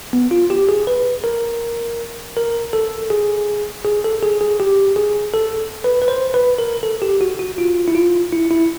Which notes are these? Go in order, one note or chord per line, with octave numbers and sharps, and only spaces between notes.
B3
F4
G4
G#4
B4
A#4
A#4
A4
G#4
G#4
A4
G#4
G#4
G4
G#4
A4
B4
B4
C5
B4
A#4
A4
G4
F#4
F#4
F4
E4
F4
E4
E4